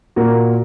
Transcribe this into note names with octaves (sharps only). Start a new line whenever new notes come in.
A#2 A#3 F#4 A#4